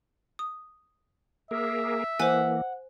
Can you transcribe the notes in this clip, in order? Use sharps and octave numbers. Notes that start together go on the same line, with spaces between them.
D#6
A#3 G#4 A#4 E5
E3 A#3 C5 F#5 G#5